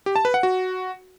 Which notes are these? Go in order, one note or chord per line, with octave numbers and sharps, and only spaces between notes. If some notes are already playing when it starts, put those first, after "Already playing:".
G4
A5
B4
F#5
F#4